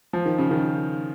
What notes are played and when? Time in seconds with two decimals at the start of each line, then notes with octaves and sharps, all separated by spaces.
0.13 F3
0.26 D#3
0.38 C#3
0.51 D#3